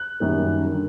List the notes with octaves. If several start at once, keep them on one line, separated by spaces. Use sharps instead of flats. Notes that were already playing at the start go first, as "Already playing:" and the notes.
Already playing: F#6
F#2 D#3 G3 A#3
D3